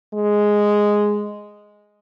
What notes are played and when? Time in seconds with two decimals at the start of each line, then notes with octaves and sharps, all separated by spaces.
0.14 G#3